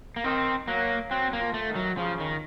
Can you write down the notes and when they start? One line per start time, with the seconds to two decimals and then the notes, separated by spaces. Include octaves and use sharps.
0.16 A#3
0.24 D#3 C4
0.68 F#3 A#3
1.10 F#3 C4
1.33 F#3 A#3
1.40 F3
1.54 A3
1.68 D#3
1.76 F#3
1.97 C#3 F3
2.20 D#3